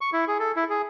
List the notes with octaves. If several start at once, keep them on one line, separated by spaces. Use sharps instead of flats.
C#6
E4
G#4
A4
E4
G#4